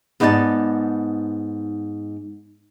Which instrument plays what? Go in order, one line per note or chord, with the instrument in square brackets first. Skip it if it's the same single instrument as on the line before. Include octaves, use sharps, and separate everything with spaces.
[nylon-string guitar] G#2 B3 D#4 D5 G5 A5